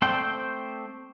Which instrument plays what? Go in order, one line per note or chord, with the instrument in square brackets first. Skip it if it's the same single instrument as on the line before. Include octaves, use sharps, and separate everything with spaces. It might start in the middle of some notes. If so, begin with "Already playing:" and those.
[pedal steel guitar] A3 C4 C5 D5 G5